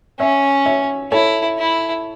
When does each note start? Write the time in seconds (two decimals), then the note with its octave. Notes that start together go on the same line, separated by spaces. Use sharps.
0.19 C#4 C#5 E5
0.66 C#5 E5
1.12 E4 A4 C#5
1.58 E4